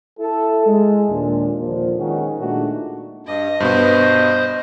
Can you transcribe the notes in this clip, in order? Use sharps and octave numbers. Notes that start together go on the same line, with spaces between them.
E4 A4
G#3
D#2 A#2 D4
D#2 A#2 D3 F3
D#3 G#3 C#4 D#4 F#4
A#2 G#3 A3 D4 D#4 F#4
G2 D#5
G2 B2 B3 C5